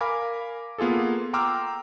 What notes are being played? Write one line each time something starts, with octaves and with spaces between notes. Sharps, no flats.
A#4 F5 G#5 B5 D6 G#6
A#3 B3 F4 G#4 A4
G5 A#5 C6 D6 E6 F6